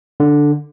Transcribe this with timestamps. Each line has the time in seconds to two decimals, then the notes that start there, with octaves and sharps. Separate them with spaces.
0.20 D3